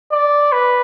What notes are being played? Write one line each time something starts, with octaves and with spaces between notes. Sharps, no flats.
D5
B4